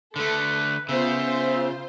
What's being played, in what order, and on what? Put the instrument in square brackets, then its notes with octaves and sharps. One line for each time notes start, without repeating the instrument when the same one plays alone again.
[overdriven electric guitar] D3 A3 [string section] A4 [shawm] B4
[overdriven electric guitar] C#3 [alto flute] B3 [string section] F4 C5 [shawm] E5